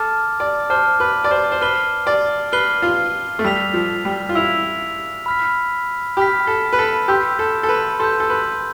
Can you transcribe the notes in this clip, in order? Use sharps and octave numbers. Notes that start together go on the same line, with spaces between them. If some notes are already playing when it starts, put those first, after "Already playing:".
Already playing: A4 A5 D6 F6 A6
D5
C5 A5 D6 F6 A6
B4
D5
C5
C5
B4 F6 C7 G7
D5
B4 F6 C7 G7
F4
A3
G3 E6 B6 F7
F3
G3
F4
E4 E6 B6 F7
B5 F6 B6
G4 B5 F6 B6
A4
B4
A4
G4 C6 E6 G6
A4
A4
B4
A4 C6 E6 G6
A4
B4